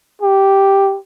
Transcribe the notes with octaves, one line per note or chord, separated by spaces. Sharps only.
G4